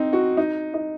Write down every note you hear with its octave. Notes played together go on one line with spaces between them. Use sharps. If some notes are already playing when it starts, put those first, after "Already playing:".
Already playing: C4 D#4
F#4
D#4
D#4